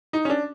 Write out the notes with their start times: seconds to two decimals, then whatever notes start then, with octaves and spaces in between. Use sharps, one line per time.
0.13 D#4
0.25 C#4
0.30 D4